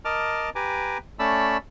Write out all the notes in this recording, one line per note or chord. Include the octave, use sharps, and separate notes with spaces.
A#4 D#5 A5 D6 F6
G4 B4 G#5 A#5 D6
A3 C#4 D5 A5 B5 E6